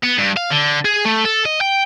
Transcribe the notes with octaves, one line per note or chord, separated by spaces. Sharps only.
B3
G2
F5
D3
G#4
A3
A4
D#5
G5